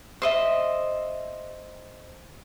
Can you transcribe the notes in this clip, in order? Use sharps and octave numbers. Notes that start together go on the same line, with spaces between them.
C5 D#5 E5